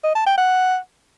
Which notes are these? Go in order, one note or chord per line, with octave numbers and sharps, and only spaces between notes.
D#5
A5
G5
F#5